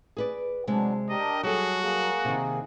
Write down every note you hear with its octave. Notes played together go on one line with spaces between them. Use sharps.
G#4 B4 D5
C3 F#3 G#3 D4
D4 G4 A#4 D#5
F#3 G3 F#4 G#4 A4
A#3 G#4
C3 D#3